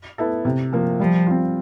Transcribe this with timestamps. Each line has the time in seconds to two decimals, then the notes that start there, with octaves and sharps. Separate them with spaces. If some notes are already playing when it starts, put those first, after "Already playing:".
0.18 B3 E4 A4
0.45 C3
0.73 F3 A#3
1.00 F3 G3
1.27 C4 F4